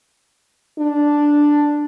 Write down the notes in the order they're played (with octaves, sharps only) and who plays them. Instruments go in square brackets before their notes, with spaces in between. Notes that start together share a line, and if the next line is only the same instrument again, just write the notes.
[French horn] D4